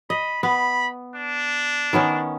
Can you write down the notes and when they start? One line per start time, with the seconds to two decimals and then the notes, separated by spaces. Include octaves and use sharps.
0.10 D#5 B5
0.43 B3 B5
1.16 D4
1.93 D#3 B3 C#4